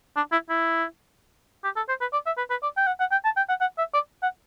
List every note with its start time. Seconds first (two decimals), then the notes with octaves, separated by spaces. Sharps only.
0.16 D4
0.32 E4
0.50 E4
1.64 G4
1.76 A4
1.88 C5
2.01 B4
2.13 D5
2.26 E5
2.38 B4
2.50 B4
2.63 D5
2.77 G5
2.87 F#5
3.00 F#5
3.12 G5
3.25 A5
3.37 G5
3.49 F#5
3.61 F#5
3.78 E5
3.94 D5
4.23 F#5